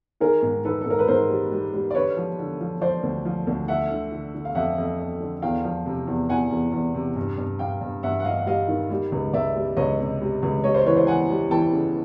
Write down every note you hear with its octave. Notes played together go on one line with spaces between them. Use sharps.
D#3 G#4 A#4
G#2
D#3 A4 B4
A4
G#2 A#4
B4
G#2 A#4 C5
G3
G3
G3
D5
D3 B4 C#5
F3
D3
F3
F3 C5 D5
D2
F3
D2
D3 E5 F#5
D3
D3
D3
F5
F2 E5 F#5
F2
F2
D3
E2 F5 G5
F3
C3
E2
E2 F#5 G#5
E2
E2
C3
G2
G2
G2 F5 G5
G2
G2 E5 F#5
F#5
G2 D#5 F5
F#5
G3 D#5 F5
D#3
G3
C#2
C#2 D5 E5
G3
C#2 C#5 D#5
C3
G3
C#2
G3 C#5 D#5
C5 D5
E3 B4 C#5
C5 D5
E3 F#5 G#5
G3
E3 G5 A5
C#3